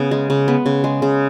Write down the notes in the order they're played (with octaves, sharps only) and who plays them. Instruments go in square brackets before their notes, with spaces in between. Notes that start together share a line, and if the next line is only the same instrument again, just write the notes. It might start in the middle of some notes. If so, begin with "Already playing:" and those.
Already playing: [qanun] C#3 B3
G#3
C#3
B3
C#3
G#3
C#3